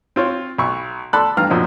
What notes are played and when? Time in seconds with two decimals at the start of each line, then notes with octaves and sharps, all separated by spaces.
0.16 C4 F4 C#5
0.58 B1 B5 C#6
1.13 A4 D5 A5 B5 C6 F#6
1.37 G2 E3 F5 A#5 F6
1.50 F#2 A#2 F3 F#3 D#4